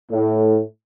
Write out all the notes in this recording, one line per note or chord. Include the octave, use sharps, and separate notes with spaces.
A2